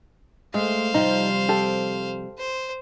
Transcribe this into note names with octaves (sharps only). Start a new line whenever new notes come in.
G#3 A3 C5 F5
C3 F3 G3 D#4
G4 A4
C5